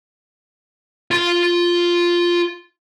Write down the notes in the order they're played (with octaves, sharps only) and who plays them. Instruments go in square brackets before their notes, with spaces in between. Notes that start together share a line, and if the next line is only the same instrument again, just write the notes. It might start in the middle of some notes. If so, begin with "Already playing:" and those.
[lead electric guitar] F4 C6